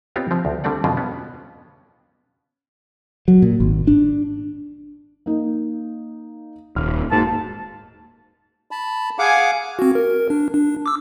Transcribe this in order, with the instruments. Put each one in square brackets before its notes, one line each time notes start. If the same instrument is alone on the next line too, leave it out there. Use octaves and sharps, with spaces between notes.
[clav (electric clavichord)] B3 C4 F4 G4 C#5 D#5
F3 C4
D2
D3 G3 A3 C4 D5 F#5
F2 B2 D3 G#3 F4 G5
B3 C#4
[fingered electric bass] F#3
A#2
G#1
D4
[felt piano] A#3 D#4
[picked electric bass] D#1 [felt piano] F6
[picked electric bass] G#2 [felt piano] A#3 F#4 A#4 [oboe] A5
[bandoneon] A5 B5
[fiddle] G#4 G#5 [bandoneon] F5 F#5 D6
[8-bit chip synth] C4 F#4
A#4
D4
D4
D6 E6